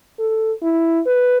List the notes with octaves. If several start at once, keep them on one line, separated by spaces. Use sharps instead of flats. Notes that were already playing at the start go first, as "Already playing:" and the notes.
A4
E4
B4